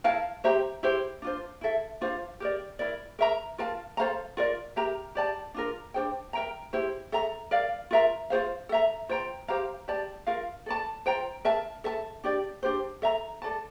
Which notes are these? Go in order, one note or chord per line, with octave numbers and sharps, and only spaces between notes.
E4 A#4 F5 A5
G4 C5 E5 A#5
E4 G4 C5
D4 F4 C5
E4 A4 E5
D4 F4 C5 F5
G4 A#4 D5
E4 A#4 D5
A#4 E5 A#5
F4 A#4 F5 A5
A4 C5 F5 A#5
F4 A#4 D5
G4 A#4 E5 A#5
G4 D5 A5
D4 F4 A#4
D4 A4 C5 G5
A#4 E5 G5 A#5
E4 G4 C5
A4 E5 A#5
A#4 D5 F5
F4 A#4 E5 A#5
F4 A4 C5 F5
A4 E5 A#5
F4 C5 G5 A#5
G4 C5 F5 A#5
G4 D5 A5
F4 A#4 F5
A4 D5 A5
F4 C5 G5 A#5
A#4 E5 A5
A4 E5 A5
D4 G4 D5
D4 G4 C5
A4 E5 A#5
A4 D5 A5